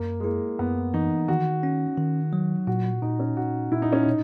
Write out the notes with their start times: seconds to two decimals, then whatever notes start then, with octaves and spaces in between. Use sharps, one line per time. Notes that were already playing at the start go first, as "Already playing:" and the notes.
Already playing: F#2 A#3
0.20 G#3
0.24 A#3 E4
0.59 F#2 B3
0.94 E3 D#4
1.28 D#3 F#4
1.63 C#4
1.98 D#3
2.33 F#3
2.67 A#2 F#4
3.02 A#2 D#4
3.20 C#4
3.37 A#2 F#4
3.72 A#2 E4
3.82 D#4
3.93 C#4
4.03 B2 D#4